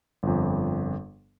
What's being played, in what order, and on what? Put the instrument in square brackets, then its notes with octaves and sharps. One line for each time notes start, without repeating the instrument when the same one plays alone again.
[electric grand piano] G1 F2